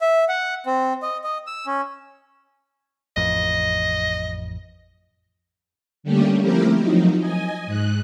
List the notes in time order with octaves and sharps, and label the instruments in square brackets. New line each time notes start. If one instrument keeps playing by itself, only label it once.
[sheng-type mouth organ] E5
F#5
C4
D#5
D#5
E6
C#4
[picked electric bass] A1 F2 [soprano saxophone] D#5
[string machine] D3 G3 A3 A#3 C#4 G4
F3 A3 C4 E4 G4 A#4
F3 F#3 D#4
D#5 G#5
G#2 F#6